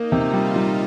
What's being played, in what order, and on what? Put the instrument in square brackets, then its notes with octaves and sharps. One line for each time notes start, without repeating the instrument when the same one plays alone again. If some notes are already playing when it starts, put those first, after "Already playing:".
Already playing: [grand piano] A#3 [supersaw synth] D#4
[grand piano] C3
[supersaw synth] F4
[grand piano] G3
G3